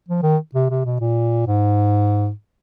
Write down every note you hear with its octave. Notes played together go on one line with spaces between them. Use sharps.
F3
D#3
C3
C3
B2
A#2
G#2